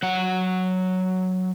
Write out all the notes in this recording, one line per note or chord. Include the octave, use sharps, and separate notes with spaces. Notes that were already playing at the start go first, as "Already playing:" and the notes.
F#3 F#5